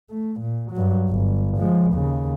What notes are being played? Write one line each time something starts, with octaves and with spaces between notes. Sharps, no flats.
A3
A#2
G2 F#3
G1
F3 G#3
D#2 C#3